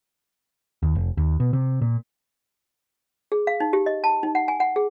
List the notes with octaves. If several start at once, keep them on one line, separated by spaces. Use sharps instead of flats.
D#2
F1
D#2
B2
C3
A#2
G#4
F5
D#4
G4
D#5
A5
D#4
F#5
G#5
F#5
G#4